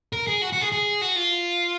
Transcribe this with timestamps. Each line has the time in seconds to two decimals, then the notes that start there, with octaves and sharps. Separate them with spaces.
0.13 A#4
0.27 G#4
0.42 F#4
0.53 F#4
0.61 G#4
0.72 G#4
1.02 F#4
1.16 F4